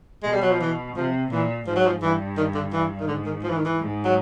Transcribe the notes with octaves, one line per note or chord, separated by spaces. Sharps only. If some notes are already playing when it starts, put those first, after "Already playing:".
B2 G#3
G3
F#3
F3
E3
C3 F3
A#2 E3
G#2 F3
F#3
F3
G2 E3
D#3
D3
E3
D#3
G#2 D3
D#3
F3
E3
D#3
E3
G#2
F#3